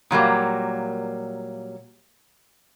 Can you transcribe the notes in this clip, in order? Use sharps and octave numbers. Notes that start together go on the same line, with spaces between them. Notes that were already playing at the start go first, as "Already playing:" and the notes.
A#2 F#3 G3 A#3